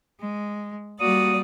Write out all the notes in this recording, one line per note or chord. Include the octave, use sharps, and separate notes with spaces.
G#3
G3 A#3 F#4 D5 D#6